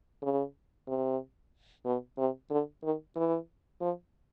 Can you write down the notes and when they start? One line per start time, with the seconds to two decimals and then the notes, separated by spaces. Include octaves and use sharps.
0.22 C#3
0.87 C3
1.85 B2
2.18 C3
2.50 D3
2.83 D#3
3.16 E3
3.81 F3